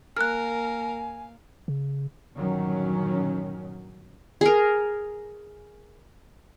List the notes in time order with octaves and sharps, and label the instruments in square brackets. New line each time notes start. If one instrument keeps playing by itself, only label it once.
[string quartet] A#3 F5 [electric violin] A#4 [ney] G#5 [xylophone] F6 F#6
[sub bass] C#3
[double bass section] G1 A#2 D#3 F#3 C#4
[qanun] G#4 A#4